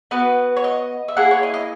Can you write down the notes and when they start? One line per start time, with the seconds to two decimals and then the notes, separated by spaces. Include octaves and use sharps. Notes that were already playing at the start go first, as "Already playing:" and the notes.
0.11 B3 F#4 B4
0.57 C#5
0.64 D#5
1.08 E5
1.17 A#3 E4 G#4 F#5
1.31 C#5
1.43 D#5
1.54 D#5